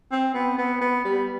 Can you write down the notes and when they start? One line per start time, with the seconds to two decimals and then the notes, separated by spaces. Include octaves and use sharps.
0.12 C4
0.34 B3
0.58 B3
0.81 B3
1.05 G3